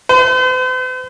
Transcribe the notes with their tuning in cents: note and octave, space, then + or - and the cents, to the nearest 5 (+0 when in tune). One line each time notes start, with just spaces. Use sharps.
C5 -45